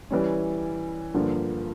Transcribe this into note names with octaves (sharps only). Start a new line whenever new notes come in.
E3 G3 C#4
G2 D3 F3 A#3